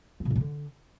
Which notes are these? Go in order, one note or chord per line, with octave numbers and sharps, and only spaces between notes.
C4
B2
G#2
C3
D3